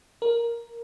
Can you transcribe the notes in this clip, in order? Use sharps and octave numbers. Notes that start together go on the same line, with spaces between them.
A#4